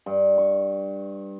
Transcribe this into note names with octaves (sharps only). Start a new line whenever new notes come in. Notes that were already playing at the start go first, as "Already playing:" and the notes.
G2
C#6